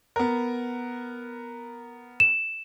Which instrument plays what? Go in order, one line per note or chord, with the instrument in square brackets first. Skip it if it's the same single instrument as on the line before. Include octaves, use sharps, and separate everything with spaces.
[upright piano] B3 A#4
[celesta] E7